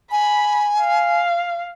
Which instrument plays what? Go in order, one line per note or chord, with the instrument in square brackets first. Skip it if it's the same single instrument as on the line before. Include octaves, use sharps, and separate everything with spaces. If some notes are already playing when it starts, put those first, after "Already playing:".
[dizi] G#5 [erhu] B5
[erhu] F5